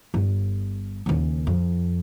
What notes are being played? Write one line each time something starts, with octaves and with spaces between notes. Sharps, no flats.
G1
D#2 C#3
F2